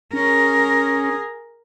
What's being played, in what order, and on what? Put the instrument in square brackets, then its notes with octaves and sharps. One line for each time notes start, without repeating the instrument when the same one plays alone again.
[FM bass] C#4 [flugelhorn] G#4 [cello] A#4